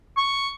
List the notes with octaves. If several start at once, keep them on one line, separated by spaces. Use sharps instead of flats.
C#6